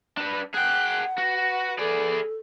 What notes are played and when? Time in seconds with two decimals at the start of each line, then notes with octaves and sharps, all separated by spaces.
0.17 D4 B4
0.54 G#4 F#5 G5 C6 F#6
1.18 F#4 B4
1.79 G#4 A4 D5